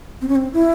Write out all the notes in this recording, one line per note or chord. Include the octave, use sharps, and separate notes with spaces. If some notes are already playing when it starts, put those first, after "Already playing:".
C4
C#4
C4
E4